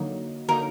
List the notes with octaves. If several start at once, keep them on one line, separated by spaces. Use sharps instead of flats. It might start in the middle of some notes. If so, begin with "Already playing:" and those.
Already playing: D3 F#3 A#3 D#4
D3 F#3 A#3 D#4 A#4